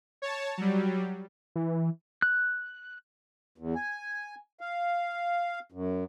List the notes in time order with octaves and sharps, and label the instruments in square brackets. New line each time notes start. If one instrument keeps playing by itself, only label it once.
[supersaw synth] C#5 A5
F#3 G3
[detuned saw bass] E3
[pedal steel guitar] F#6
[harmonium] E2
G#5
F5
F#2